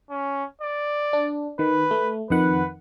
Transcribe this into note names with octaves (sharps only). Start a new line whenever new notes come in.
C#4
D5
D4
D#3 B4
A3
F2 D#3 B4 F#5